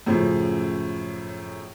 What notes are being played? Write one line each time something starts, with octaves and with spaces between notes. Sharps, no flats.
F#2 A2 C#3 F3